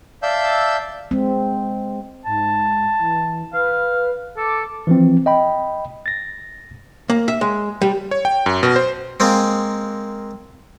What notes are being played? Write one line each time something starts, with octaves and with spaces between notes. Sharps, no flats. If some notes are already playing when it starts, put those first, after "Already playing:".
D5 E5 F5 A5 E6 G6
G#3 C4
G#2 A5
E3
B4 F5
A4 D6
E3 F3 C4
D#5 G5 B5
A6 A#6
A#3
E5
G#3
G3
C#5
G5
F#2
B2
C5
G#3 A#3 C4